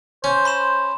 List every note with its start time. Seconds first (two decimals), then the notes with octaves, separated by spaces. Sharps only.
0.24 C#4 C5
0.45 B5 C6 E7